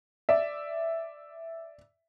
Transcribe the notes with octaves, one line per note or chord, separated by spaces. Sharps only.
D5 E5